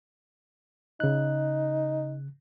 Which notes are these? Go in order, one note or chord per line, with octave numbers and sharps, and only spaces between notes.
C#3 D#4 F#6